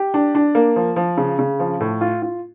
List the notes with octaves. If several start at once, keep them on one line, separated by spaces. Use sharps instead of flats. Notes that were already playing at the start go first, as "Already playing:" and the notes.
Already playing: G4
D4
D4
A#3
F3
F3
C#3
C#3
F3
A2
F4
F4